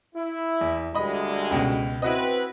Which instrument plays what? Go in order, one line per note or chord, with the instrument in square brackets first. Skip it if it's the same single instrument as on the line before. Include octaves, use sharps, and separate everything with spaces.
[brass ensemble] E4
[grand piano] E2
[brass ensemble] D2 G3 G#3 [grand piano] D#5 B5
[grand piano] C#2 B2
[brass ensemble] C4 B4 [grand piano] E4 F#4 D#5